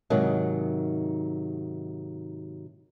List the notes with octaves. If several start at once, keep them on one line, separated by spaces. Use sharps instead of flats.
G#2 C3 D#3 F#3